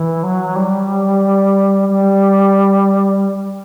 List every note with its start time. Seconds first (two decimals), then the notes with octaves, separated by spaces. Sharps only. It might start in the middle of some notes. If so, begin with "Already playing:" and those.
Already playing: E3
0.23 F#3
0.56 G3
1.89 G3